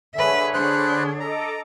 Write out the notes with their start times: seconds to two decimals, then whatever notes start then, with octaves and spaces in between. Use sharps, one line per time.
0.14 D3 G#4 B4 C#5 E5
0.54 D4 C5 B5 F#6
1.20 A4 D#5 A#5 D6